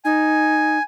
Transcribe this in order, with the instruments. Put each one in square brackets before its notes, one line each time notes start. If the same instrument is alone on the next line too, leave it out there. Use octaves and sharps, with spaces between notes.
[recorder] D#4 [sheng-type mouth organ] G#5